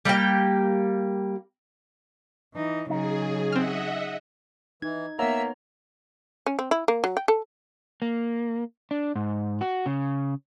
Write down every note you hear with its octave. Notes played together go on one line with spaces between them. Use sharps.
G3 A#3 G4 G5
E3 D#4
C#3 F#3 D#4 G#4
C4 D#5 E5 F#5 F6
E3 D#4 G#6
A#3 B3 C#5 E5 F#5 A#5 E6
C#4
C4
E4
A#3
F#3
G5
A4
A#3
D4
G#2
F#4
C#3